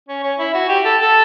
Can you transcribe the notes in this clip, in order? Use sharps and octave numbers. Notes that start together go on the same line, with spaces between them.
C#4
C#4
E4
F#4
G4
A4
A4